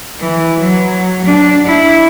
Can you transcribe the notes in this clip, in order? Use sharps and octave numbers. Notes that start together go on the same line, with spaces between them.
E3
F#3
D4
E4